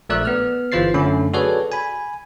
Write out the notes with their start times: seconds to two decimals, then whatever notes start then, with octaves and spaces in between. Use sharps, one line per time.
0.09 A#1 A3 A#4 D5 E6 F#6
0.25 B3 F6
0.72 G1 E3 F4 C5 A6 C7
0.94 F#2 D3 A3 C#4 B5
1.34 F#4 G#4 A4 B4 C#5 D5
1.72 G#5 B5